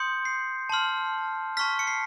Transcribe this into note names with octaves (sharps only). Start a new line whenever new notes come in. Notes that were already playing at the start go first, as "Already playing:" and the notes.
Already playing: C6 D#6 G6 C#7
C7
A5 C6 F6
A5 C#6 F6 B6
C#7
C7